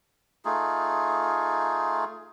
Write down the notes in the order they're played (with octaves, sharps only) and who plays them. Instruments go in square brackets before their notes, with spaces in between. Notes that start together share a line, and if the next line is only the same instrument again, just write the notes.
[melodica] A3 D#4 F4 G#4